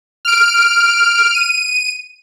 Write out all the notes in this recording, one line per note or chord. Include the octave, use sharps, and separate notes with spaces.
F6 D7
D#7